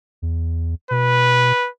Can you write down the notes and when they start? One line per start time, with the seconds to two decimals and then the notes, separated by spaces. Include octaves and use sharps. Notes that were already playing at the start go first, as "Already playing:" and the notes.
0.22 E2
0.91 B2 B4